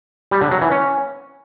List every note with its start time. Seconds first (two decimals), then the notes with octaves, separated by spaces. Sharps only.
0.31 G3
0.41 D3
0.51 F#3
0.62 E3
0.72 C#4